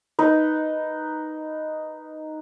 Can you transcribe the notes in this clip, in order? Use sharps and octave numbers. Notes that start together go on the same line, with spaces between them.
D#4 B4